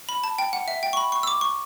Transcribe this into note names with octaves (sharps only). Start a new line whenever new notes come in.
B5
A5
G5
F#5
E5
G5
C#6
B5
C#6
E6
D6
C#6